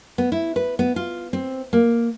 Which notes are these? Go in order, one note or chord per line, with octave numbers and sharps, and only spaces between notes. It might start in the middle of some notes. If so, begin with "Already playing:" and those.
B3
E4
B4
B3
F4
C4
A#3